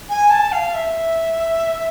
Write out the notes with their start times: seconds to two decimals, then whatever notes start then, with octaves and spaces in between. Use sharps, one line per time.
0.09 G#5
0.30 A5
0.52 F5
0.74 E5